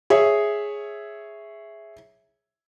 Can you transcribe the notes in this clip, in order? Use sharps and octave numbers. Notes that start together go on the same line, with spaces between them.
G#4 C#5 E5